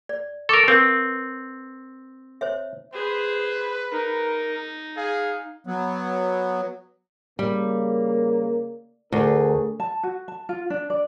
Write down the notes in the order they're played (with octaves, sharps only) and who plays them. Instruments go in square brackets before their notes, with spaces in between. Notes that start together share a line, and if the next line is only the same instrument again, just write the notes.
[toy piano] D5
[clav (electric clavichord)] A4 A#4 [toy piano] C#6 D6
[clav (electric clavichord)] C4 [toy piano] A#4 B4 F5
[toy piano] C5 C#5 E5
[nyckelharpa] G#4 C5 [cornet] B4
[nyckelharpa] D#4 [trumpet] A#4
[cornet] G#4 [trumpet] F5
[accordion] F#3 B3
[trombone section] C#3 A#3 [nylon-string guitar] G3
[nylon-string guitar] D2 [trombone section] D4 G#4 A#4
[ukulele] A5
F#4
A5
F4
D4
D5